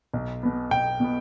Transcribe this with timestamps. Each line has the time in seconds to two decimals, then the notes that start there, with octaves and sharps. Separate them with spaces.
0.14 B1
0.43 B2 B3
0.71 B1 G5
1.00 B2 B3